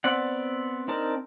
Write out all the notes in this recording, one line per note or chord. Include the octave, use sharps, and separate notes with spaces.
B3 C4 D5 F#5
C4 D4 D#4 A#4 A5